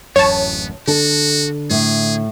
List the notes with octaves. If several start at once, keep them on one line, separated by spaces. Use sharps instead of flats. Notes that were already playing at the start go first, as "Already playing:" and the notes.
D1 A1 F#2 B3 C#5 A5
D3 D4 F#4 A4
A2 G#4